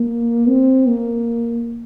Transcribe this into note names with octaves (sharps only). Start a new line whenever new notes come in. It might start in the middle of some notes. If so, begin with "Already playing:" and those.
Already playing: A#3
C4
A#3